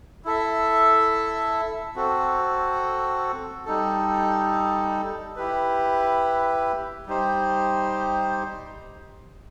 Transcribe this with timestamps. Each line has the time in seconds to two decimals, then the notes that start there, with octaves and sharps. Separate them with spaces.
0.25 E4 A4 E5
1.96 C4 F#4 A4
3.65 G3 D#4 A4
5.36 E4 G4 B4
7.06 G3 D#4 G4 C5